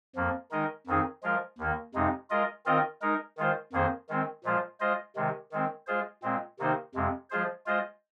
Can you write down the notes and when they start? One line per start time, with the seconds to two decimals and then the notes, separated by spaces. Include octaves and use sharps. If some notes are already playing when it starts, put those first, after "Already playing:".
0.16 F2 F3 A#3
0.51 D#3 G#3 D#4 A#4 D#5
0.87 F2 D#3 C4 D#4 G#4
1.23 F3 G#3 F4 A#4
1.58 D#2 D#3 A#3
1.94 F2 C3 G#3 D#4
2.30 G#3 F4 A#4 D#5
2.66 D#3 C4 F4 A#4 D#5
3.02 G#3 D#4 A#4
3.37 D#3 G#3 F4 C5
3.73 F2 D#3 A#3 G#4 C5
4.09 D#3 G#3 C4
4.44 A#2 F3 G#3 F4 C5
4.80 G#3 F4 C5 D#5
5.16 C3 D#3 G#3
5.52 D#3 G#3 C4
5.87 G#3 F4 G#4 C5
6.23 A#2 G#3 C4
6.59 C3 D#3 A#3 D#4 C5
6.95 F2 C3 G#3
7.30 F3 G#3 F4 G#4 C5
7.66 G#3 F4 C5 D#5